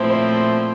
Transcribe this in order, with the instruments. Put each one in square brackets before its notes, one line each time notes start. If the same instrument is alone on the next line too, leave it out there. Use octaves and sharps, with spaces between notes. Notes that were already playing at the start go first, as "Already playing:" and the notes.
Already playing: [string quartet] A#2 F3 A3 C4 E4 [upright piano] C5 C#5
[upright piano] C5